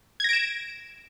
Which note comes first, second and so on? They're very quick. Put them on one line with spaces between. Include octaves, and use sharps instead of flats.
G#6 A#6 D7 E7